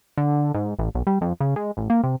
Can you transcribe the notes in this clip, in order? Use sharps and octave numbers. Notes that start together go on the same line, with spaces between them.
D3
G#2
A1
B1
G3
F2
C#3
G#3
A1
A#3
C3